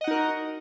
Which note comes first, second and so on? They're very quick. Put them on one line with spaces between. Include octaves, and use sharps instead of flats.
D#5 F#5 D#4 A#4 F#4